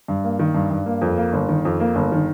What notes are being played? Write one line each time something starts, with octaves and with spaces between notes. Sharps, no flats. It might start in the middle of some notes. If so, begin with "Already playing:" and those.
G2
A#3
D#3
G2
G2
A#3
F2
A#3
G1
D#3
F2
A#3
G1
D#3